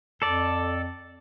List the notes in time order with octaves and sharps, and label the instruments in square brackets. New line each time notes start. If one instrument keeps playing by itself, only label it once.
[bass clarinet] F2 [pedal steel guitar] A4 D5